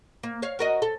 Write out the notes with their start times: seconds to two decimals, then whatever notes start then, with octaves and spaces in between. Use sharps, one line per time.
0.23 A#3
0.42 C#5 F5
0.59 F#4 A#4 D#5
0.82 A4